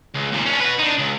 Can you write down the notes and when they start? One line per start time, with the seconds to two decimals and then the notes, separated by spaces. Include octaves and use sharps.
0.15 C#2
0.32 D#2 A#2
0.46 C#4 D4
0.60 F#4 B4
0.79 D4 D#4
0.99 C#2